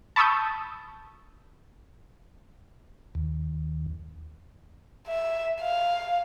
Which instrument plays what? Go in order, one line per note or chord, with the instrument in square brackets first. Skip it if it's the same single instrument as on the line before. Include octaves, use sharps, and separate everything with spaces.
[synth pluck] A5 B5 C#6 D#6 E6 G6
[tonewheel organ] D#2
[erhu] E5
F5